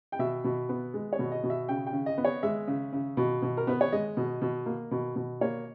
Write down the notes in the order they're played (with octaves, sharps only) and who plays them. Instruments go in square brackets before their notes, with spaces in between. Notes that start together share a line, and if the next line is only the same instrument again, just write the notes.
[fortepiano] G5
B2 E5
B2
B3
G#3
C#5
B2
D#5
B2
E5
C#3 G5
G5
C#3
D#5
B3
C#5
G#3 E5
C#3
C#3
B2
B2
A#4
B3 B4
C#5
G#3 D#5
B2
B2
A#3
B2
B2
A#3 C#5